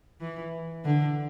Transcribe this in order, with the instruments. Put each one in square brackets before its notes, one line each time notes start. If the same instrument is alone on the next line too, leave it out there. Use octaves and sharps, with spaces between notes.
[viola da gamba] E3
D3